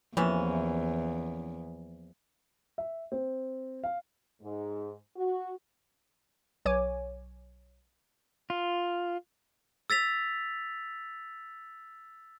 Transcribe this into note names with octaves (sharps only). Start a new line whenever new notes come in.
E2 C3 E3 F3 A#3 C#4
E5
C4
F5
G#2
F#4
B1 C#5 G#5 D6
F4
E6 A6 B6 F7